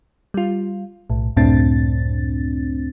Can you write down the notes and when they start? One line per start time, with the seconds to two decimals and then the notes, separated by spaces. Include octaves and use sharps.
0.34 G3 F4
1.10 B1 A2
1.36 C#2 F#2 A2 C4 D4 A6